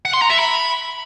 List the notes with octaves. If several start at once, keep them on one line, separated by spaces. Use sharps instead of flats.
F#5
C6
A#5
E5
B5